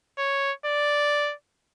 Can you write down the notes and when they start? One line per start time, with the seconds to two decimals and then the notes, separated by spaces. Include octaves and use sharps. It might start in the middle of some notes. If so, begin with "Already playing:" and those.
0.18 C#5
0.66 D5